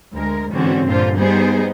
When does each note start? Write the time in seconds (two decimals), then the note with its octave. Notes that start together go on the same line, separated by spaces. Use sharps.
0.13 D2 G#3 A#4
0.52 G#2 D3 E3 C4 C#4 F#4
0.86 G2 A#2 D3 F4 C5
1.18 G3 B3 D#4 G#4 C5